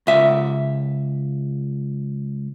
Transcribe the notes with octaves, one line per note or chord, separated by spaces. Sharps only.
C#2 E5